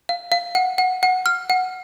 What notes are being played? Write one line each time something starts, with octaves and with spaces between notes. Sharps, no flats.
F5
F5
F#5
F#5
F#5
F6
F#5